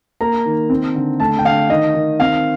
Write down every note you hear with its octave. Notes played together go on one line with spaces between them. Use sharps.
A#3 A#5
D#3
C4
D3
A3 A5
G5
D3 F5
D#3 D#5
D#3
C4 F5